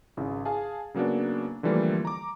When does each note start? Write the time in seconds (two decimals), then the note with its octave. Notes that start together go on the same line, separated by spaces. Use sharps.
0.17 G#1 C#3 E4
0.45 G#4 F5 G#5 A5
0.94 C#3 F#3 A#3 B3 D4
1.63 D3 E3 F3 G3 A3 A#3
2.05 A#5 D6